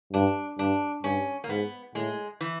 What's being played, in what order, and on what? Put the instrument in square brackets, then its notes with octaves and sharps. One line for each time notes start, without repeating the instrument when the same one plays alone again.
[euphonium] G2 [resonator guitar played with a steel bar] D4
[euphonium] G2 [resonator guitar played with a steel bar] D4
[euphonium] G2 [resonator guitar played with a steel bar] C#4
[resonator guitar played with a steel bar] A#3
[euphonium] G#2 [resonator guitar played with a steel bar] B3
[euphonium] A2 [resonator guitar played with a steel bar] G#3
[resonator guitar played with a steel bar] E3